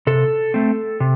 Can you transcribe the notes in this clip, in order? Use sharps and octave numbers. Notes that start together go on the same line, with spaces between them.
C3 A4
A3 C4
C3